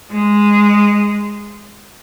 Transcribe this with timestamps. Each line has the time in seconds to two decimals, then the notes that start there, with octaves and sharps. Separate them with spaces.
0.11 G#3